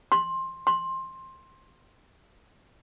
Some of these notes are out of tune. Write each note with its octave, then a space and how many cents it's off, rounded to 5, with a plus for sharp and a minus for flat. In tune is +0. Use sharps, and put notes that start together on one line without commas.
C6 +15
C6 +15